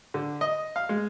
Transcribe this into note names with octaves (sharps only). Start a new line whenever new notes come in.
D3
D#5
F5
G#3